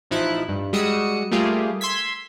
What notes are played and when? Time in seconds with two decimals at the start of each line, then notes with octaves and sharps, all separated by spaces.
0.11 A1 F3 D#4 E4 F#6
0.49 G2
0.73 G3 G#3 F#4 D#6 E6 C#7
1.31 G3 A3 A#3 F4 G4 G#4
1.81 C6 E6 G#6 B6